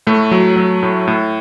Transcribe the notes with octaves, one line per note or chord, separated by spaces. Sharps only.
A2 A3
F#3
F#3
A2
A2